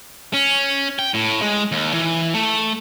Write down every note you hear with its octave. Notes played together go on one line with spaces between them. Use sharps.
C#4
G5
A2
G#3
D#2
E3
A3